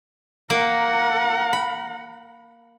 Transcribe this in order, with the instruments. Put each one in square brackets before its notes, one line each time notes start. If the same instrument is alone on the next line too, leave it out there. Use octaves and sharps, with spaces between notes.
[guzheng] A#3 [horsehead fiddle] A#4 F#5
[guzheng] B5